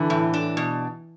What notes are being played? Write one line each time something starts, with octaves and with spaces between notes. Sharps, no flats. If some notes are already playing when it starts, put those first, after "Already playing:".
Already playing: D3 E3
A2
D4
B2